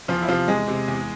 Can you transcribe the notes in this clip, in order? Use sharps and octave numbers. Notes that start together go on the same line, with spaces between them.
E2 F3 F4
E4
C3 F3 F4
E2 G#3 G#4
C3
E2